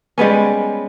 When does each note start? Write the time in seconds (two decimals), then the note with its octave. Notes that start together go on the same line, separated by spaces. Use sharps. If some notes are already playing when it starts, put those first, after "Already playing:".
0.18 G3 G#3 B3 C#4